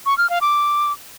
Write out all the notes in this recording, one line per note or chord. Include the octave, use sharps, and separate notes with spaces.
C#6
F6
F5
D6